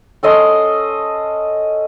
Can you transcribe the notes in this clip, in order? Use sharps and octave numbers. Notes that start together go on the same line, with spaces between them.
C#4 A4 D#5 C6